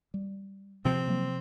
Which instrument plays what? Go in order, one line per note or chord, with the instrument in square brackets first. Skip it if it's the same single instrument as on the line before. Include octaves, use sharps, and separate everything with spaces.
[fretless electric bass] G3
[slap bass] C3 F3 [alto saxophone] C4
[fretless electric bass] F#3 A#3